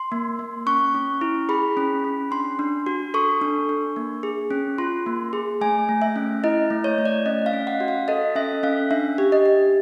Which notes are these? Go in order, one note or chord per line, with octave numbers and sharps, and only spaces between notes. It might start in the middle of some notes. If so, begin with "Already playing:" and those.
Already playing: C6
A#3
A#3
C#4 C#6
C#4
E4
G#4 B5
C#4
C#4
D4 C6
D4
F#4
A4 C#6
D4
D4
A#3
G#4
C#4
F4 C6
A#3
G#4
A3 G#5
A3
E5
C#4
E4 D#5
A3
C#5
A3
D5
C#4 D#5
F5
C#4
F#5
F#4
F5
A4 D#5
C#4 E5
C#4 F5
D4 E5
G4
D#5
G4